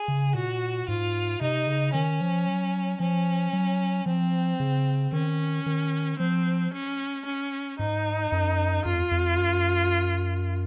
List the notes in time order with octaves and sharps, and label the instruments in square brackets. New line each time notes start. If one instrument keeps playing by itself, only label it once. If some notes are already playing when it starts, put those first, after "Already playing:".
Already playing: [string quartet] G#4
[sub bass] C#3
[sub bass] A#2 [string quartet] F#4
[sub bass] G#2 [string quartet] F4
[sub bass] C3 [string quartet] D#4
[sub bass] C#3
[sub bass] D#3 [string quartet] C#4
[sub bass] F3
F#3
[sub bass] F3 [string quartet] C#4
[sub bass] F#3
[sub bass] F3 [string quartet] C4
[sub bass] C#3
[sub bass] D#3 [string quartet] C#4
[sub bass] D#3
[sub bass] F3 [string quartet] C4
[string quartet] C#4
C#4
[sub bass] G#2 [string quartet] D#4
[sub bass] F#2
[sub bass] F#2 [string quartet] F4
[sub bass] F2
F2
F#2